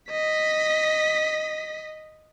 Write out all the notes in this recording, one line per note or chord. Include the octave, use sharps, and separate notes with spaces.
D#5 B6